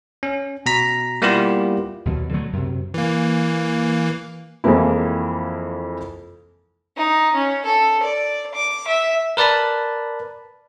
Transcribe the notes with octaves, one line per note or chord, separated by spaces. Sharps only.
C#4
B2 A#5 B6
G3 A#3 B3 E4 F4 G4
D#2 B2 F#3
D3 F#3 A3 B3
F#2 C3
E3 A#3
F2 E3 F3 G#3 A#3 E4
D#4
C#4
A4
D5
D6
E5
A#4 B4 D5 A5 B5